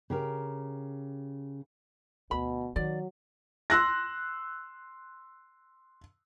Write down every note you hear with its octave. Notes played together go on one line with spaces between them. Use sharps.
C#3 G4 A#4
D2 B2 B5
D#3 F#3 D5
C6 E6 F#6 A#6